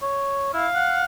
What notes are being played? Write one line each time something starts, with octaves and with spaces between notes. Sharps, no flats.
C#5
E4 F5 F6
F#5